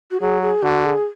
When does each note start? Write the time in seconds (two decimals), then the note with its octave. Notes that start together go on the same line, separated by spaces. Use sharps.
0.11 F#4
0.20 F#3 G#4
0.42 G#4
0.62 D3 F#4
0.85 G#4